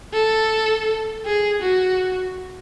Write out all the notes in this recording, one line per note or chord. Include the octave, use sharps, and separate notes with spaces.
A4
G#4
F#4